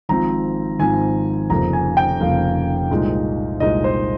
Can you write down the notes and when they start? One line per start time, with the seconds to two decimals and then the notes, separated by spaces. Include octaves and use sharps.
0.09 G#1 G#2 F3 C4 A#5
0.79 G#1 G#2 F3 C4 G#5
1.50 F1 F2 C#3 F3 A#3 A#5
1.73 G#5
1.97 G5
2.20 F1 F2 C#3 F3 A#3 F5
2.90 C2 A#2 G#3 D#4
3.60 C2 A#2 G#3 D#4 D#5
3.84 C5